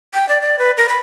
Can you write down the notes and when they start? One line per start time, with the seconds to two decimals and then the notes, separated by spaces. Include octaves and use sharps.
0.14 G5
0.29 D5
0.41 D5
0.59 B4
0.77 A#4
0.89 B5